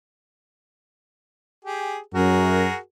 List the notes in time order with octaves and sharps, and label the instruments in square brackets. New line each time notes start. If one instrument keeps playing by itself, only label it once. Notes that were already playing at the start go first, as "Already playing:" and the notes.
[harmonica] G4 G#4
[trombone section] F#2 [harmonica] F#4 G#4 A#4